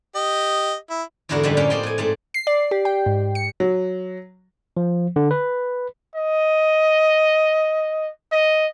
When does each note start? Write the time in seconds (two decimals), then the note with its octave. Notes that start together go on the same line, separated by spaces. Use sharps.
0.15 G4 D#5
0.90 E4
1.29 E2 G#2 D3 E4 F#4 A#4
1.43 F#2 A#2 D3 F3 G3 G#3
1.57 A2 A#3 C#4 G5
1.70 C4 D5 D#5 G5 C6
1.83 A2 G#5
1.98 G#2 A3 C4
2.34 C7
2.47 D5
2.71 G4
2.85 G5
3.06 G#2
3.35 C#7
3.60 F#3
4.77 F3
5.16 D3
5.31 B4
6.15 D#5
8.32 D#5